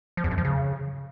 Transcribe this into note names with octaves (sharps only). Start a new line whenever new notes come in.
F3
E2
F#2
F3
C#3